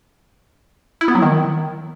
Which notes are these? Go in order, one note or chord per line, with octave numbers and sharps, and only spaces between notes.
E4
B3
F#3
D#3